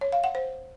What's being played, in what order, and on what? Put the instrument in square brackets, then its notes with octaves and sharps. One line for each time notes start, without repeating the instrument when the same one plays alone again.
[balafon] C#5
F5
F#5
C5